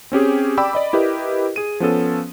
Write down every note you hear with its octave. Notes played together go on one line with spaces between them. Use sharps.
C4 C#4 G4 G#4
D5 G5 B5 D6 E6
D5 D#5 B5
E4 G4 A#4 B4 D#5
G#4 D#7
F3 B3 C#4 A4